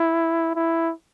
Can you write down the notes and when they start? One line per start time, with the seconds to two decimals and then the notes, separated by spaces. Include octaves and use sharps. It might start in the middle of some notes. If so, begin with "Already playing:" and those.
Already playing: E4
0.55 E4